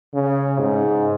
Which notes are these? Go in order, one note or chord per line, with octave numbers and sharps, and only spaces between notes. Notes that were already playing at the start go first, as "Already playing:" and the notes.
C#3
G#2